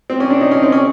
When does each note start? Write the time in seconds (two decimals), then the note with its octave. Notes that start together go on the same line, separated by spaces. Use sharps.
0.10 C4
0.20 C#4
0.30 D4
0.41 D#4
0.51 C#4
0.62 C4
0.72 C#4